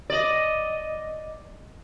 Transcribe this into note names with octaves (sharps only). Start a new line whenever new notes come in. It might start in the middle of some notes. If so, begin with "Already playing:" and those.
D5 D#5